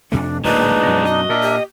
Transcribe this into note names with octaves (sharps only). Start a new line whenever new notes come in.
F2 C3 A3 D4
D1 A#1 F3 G#3 A#3 D4 D#4 B4
F#2 B2
F#4 D#5
A#2 D4 A#4 E5
G4